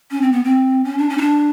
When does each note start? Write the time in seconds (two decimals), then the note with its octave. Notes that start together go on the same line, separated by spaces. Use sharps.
0.11 C#4
0.22 C4
0.32 B3
0.44 C4
0.85 C#4
0.98 D4
1.09 C#4
1.18 D#4
1.22 D4